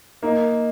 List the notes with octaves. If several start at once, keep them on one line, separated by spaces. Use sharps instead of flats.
A#3 D#4